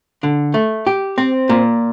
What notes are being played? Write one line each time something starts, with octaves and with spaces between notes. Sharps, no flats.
D3
A3
G4
C4
A#2